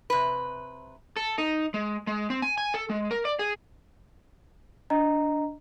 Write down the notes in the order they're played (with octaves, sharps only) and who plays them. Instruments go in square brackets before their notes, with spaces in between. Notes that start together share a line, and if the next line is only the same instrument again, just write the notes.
[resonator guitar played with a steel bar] C3 B4
[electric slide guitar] A4
D#4
G#3
G#3
C4
G#5
G#5
A4
G#3
A#4
D5
G#4
[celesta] D4 D#5 A#5